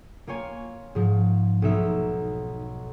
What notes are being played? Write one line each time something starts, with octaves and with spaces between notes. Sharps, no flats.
A#3 F4 C#5 G#5
G#2 F3
B1 A#3 D#4 E5